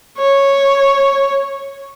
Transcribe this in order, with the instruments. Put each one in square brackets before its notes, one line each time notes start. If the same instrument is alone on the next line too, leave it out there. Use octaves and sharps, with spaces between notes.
[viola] C#5